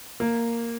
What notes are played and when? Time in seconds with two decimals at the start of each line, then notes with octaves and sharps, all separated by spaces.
0.20 A#3